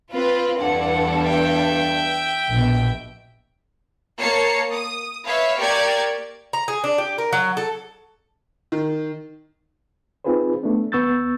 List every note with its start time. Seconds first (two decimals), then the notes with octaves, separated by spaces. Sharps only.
0.12 C4 F4 B4
0.60 E2 G2 A4 F#5
1.23 E5 G5
2.51 A#1 B2
4.18 A#3 C#5 A5 C7 C#7
4.72 D#6
5.27 B4 C#5 E5 F5
5.60 A#3 G4 D5 C#6 G#6
6.53 A#5
6.68 G#4
6.84 D4
6.98 G4
7.18 A#4
7.33 F#3
7.57 A4
8.72 D#3
10.24 C4 D#4 F4 G#4 B4 C5
10.63 A3 B3 D4
10.92 D#2 B3 C#6 E6 G6 A6